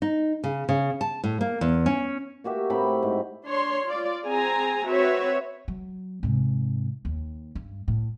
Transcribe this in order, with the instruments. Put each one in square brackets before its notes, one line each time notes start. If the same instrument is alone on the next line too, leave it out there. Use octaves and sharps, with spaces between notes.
[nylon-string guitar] D#4
C#3
C#3
A5
A2
A#3
E2
C#4
[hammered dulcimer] A#3 F#4 G4 E5
A2 C4 A#5 B5
G#2
[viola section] D4 C#5 C6
F4 D5
C4 G#4 G#5 A#5
C4 F#4 B4 C#5 E5
[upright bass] F#3
G#2 C3
D#2
G2
A2